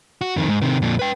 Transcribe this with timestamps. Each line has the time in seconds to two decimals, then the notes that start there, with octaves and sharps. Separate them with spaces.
0.21 F#4
0.36 F2 D#3
0.49 G#2
0.62 C3 D#3
0.82 F2 A#2
0.99 B4 G5